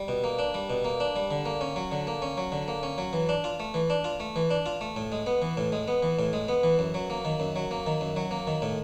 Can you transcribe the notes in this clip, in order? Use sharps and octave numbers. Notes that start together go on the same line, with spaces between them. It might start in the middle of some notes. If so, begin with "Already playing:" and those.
Already playing: G3
B2
A#3
D4
G3
B2
A#3
D4
G3
D3
A#3
C#4
F#3
D3
A#3
C#4
F#3
D3
A#3
C#4
F#3
E3
D4
F4
A3
E3
D4
F4
A3
E3
D4
F4
A3
A2
G#3
B3
E3
A2
G#3
B3
E3
A2
G#3
B3
E3
F#2
F#3
A#3
D#3
F#2
F#3
A#3
D#3
F#2
F#3
A#3
D#3
A2